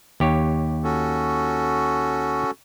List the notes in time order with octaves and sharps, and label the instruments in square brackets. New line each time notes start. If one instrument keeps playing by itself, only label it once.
[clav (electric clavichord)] D#2 G4 C#5
[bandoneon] C#4 F#4 A4